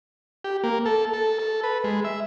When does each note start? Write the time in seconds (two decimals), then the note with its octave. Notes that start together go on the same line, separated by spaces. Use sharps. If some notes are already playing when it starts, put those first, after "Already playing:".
0.44 G4
0.64 A#3
0.85 A4
1.13 A4
1.39 A4
1.63 B4
1.84 G#3
2.05 E5